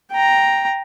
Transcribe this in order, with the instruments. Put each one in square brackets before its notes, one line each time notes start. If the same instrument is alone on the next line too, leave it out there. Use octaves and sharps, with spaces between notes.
[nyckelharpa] G5 A#5